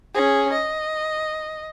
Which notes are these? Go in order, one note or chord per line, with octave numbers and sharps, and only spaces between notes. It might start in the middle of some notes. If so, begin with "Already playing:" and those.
C#4 G#4
D#5